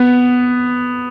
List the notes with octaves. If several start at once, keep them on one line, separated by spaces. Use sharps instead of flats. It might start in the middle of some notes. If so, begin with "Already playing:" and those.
Already playing: B3